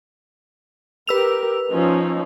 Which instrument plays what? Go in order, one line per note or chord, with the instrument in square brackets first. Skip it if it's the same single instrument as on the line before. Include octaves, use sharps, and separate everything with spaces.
[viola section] G4 A#4 [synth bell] B4 E6 F7
[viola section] F3 C#4 D#4